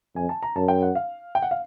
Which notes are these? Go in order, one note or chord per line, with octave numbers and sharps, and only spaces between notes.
F2 G#5
A5
A#5
F#2 A5
G5
F#5
F5
G5
F#5
F5